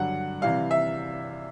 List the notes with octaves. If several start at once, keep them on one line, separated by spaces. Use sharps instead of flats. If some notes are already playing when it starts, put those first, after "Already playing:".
Already playing: G2 D3 F#3 F#5
C3 E3 G3 F5
E5